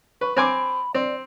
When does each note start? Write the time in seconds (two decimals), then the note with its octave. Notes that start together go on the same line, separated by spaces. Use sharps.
0.21 B4 C#6
0.37 C4 G#5 B5 D6
0.94 C4 D5